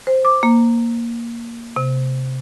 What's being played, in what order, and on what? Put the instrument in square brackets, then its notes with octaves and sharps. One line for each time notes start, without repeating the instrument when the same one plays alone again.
[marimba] C5
D6
A#3
C3